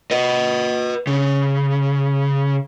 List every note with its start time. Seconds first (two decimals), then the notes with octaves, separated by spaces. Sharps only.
0.11 B4 D#5
1.07 C#3